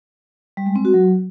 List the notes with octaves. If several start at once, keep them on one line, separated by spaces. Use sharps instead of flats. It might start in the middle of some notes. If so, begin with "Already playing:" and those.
G3
G#3
C4
F#4
F#3